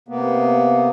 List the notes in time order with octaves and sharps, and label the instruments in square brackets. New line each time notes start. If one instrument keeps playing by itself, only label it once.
[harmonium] C3 A#3 B3